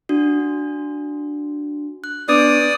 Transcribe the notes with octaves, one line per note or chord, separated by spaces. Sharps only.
D4 F#4
F#6
B3 D4 B4 D5 D#6